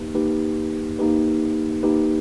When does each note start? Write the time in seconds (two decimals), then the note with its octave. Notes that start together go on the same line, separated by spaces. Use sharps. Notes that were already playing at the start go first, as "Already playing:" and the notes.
Already playing: A#3 D#4 G4 B4
0.14 A#3 D#4 G4 B4
0.99 A#3 D#4 G4 B4
1.83 A#3 D#4 G4 B4